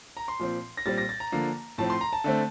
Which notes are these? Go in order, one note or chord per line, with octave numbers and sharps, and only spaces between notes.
A#5
C6
A#2 F3 C4
A#6
A#2 G3 C4 A6
A#6
A6
A#5
D3 F3 A#3
A2 F3 C4 A5
C6
A#5
A5
D3 A3 C4